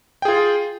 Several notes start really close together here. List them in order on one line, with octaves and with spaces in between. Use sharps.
G5 G#4 F4